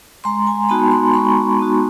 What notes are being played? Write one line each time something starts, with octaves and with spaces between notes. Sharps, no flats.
G#3 A#5 C6
G#5 A#5
B3 D#4 F#4 A5 B5
A#5 C6
G#3 B5 C#6
B3 D#4 F#4